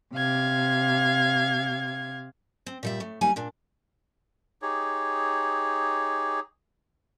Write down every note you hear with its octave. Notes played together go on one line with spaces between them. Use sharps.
C3 F5 G#6
C4
A#2 G3 E5
A2 A3
D2 G3 A#3 D#4 G#5
A#2 D4
D#4 G4 G#4 C#5